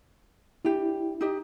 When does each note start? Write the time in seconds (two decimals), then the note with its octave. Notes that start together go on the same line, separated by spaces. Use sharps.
0.65 D4 E4 G4
1.21 D#4 G4 D#5